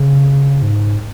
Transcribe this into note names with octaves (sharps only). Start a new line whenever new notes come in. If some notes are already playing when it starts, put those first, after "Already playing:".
Already playing: C#3
G#2